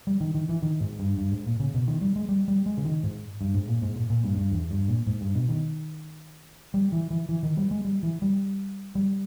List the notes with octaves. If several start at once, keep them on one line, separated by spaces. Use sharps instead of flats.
G3
D#3
D#3
E3
D#3
G#2
G2
G2
G#2
A#2
C#3
B2
D#3
G3
G#3
G3
G3
G#3
C#3
D#3
G#2
G2
G#2
A#2
G#2
A#2
A#2
G2
G2
E2
G2
A#2
G#2
G2
B2
D#3
G3
E3
E3
E3
D#3
G3
G#3
G3
E3
G3
G3